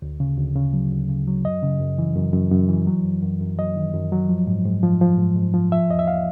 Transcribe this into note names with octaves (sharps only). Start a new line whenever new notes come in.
D2
C#3
D2
C#3
F#3
D2
C#3
F#3
F#2 D#5
C#3
F#2
E3
F#2
F#2
F#2
E3
F#3
F#2
F#2
F#2
F#3 D#5
D#3
F#2
F#3
F3
G#2
G#2
F3
F3
G#2
G#2
F3
F3 E5
E2 D#5
E5
F5